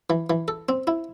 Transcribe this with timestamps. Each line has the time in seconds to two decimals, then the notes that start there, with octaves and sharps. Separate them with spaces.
0.10 E3
0.30 E3
0.48 A4
0.69 C4
0.87 E4